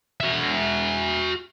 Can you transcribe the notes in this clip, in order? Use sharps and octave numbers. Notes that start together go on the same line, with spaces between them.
F#4 E5